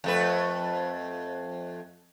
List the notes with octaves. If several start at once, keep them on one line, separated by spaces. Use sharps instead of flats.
F2 A3 B4